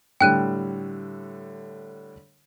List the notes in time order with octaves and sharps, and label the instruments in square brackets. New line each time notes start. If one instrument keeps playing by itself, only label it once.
[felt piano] A2 D3 G3 [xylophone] G5 F#6 D#7